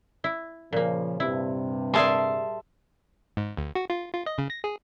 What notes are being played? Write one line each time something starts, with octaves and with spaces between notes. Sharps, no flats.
E4
A#2 C#3 F3 A#3
G2 C3 E4
G3 G#4 A#4 E5 A5 C6
G#2
D2
F#4
F4
F4
D#5
C#3
A#6
G#4